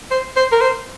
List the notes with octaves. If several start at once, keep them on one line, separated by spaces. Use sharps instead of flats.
C5
C5
A#4
C5